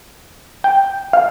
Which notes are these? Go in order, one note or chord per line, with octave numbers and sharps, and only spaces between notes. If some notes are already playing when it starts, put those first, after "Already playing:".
G5
F5